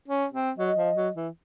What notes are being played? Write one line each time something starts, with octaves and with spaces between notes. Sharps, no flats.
C#4
C4
F#3 D#5
F3
F#3
E3